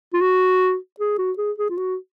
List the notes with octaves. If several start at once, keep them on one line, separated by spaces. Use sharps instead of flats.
F4
F#4
G#4
F#4
G#4
G#4
F4
F#4